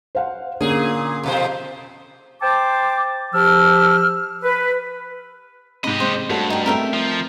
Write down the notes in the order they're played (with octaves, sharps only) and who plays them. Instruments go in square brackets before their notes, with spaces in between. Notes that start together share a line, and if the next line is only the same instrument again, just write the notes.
[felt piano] C5 F5 F#5
[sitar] A#2 G#4 [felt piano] D3 A#3 C#4
[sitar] F2 B2 C5
[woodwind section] C5 G5 A5 D6
F3 G4 E6 F6
B4
[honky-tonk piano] G#2 C3 [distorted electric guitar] G4 D#5 [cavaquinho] B5
[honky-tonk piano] C3 G#3 [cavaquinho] C5
[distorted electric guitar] G2 [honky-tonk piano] A3 F#4 A4
[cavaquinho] D#4 G5
[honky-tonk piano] A3 C4 [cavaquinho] A#4 E5 G5
[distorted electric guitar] F3